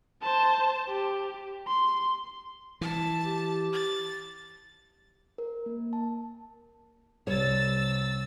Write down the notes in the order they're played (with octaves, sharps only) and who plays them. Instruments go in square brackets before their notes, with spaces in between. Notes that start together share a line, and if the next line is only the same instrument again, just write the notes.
[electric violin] C5 A5
G4
C6
[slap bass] E3 [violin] A5
[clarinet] G4
[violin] A6
[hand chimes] A#4
A#3
A5
[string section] C2 E6 A6 [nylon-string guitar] G3 C#5